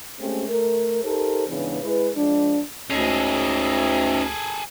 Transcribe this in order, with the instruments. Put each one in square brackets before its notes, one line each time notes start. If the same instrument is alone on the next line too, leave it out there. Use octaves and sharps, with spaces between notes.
[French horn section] G#3 A3 C4 C#4 G4
A3 A#4
D#4 G4 A4 A#4 C5
G#2 C#3 E3 B3 D4
G#3 E4 B4
F3 G#3 D4
[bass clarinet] D2 [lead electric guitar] C#4 D#4 [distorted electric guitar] G#4 A4